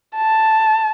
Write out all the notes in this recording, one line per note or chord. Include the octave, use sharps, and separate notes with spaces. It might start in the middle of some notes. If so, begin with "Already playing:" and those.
A5